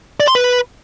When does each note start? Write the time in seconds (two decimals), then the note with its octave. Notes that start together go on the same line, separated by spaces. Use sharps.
0.20 D5
0.28 C6
0.35 B4